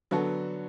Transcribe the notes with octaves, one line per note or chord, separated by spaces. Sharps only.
D3 F#3 B3 F#4 A4